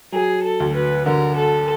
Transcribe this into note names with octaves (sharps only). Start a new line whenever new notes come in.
F#3 G#4
A4
D2
B4
D3 A#4
A4